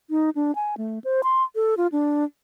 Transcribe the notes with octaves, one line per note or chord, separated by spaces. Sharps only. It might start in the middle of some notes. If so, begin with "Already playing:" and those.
D#4
D4
G#5
A3
C5
C6
A4
F4
D4